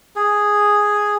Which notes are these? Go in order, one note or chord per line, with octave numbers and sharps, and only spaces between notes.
G#4